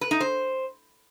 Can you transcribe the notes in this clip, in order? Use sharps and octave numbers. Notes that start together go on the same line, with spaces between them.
B4
D#4
C5